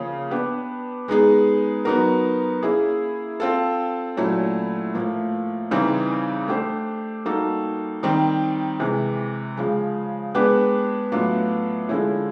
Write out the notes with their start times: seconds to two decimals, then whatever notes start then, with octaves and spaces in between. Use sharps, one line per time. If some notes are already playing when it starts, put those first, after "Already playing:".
Already playing: C#3 F3 A#3 C#4 F4
0.31 B3 D4 G4 B4
1.08 G#3 B3 D#4 G#4
1.85 F#3 B3 D#4 F#4 A#4
2.63 A#3 C#4 E4 G#4
3.40 C4 F4 A4
4.17 A#2 F#3 A3 C#4 E4
4.94 A2 F3 A#3
5.71 C#3 E3 G3 C4 D#4
6.48 A3 D4 G4 C5
7.25 G3 A#3 D#4 F#4 A4
8.03 D#3 G3 C4 D#4
8.80 C3 E3 G#3
9.57 C#3 F3 G#3
10.35 G#3 B3 D4 G4 B4
11.12 A2 F#3 B3 D4 F4
11.89 D3 F3 G#3 C#4 E4